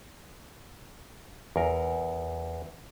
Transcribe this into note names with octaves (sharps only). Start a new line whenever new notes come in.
E2 A#4